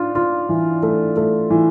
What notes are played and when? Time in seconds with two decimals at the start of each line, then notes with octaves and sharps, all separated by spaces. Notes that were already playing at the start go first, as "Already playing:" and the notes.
Already playing: D4 F4
0.15 F4
0.49 E3
0.83 A3
1.17 A3
1.50 E3